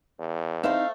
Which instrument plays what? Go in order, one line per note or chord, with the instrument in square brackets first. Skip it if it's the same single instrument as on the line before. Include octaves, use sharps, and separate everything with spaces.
[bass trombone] E2
[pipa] A3 C5 E5 [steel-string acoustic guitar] C4 D#4 E4 [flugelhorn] F5